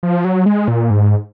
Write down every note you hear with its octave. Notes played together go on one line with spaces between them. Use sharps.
F3
F#3
G#3
A#2
G#2